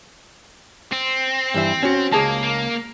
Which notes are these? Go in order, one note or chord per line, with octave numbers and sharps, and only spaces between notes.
C4
G2 E3 E5
C#4 F#4
C#2 A#3 G#4 A5
A#3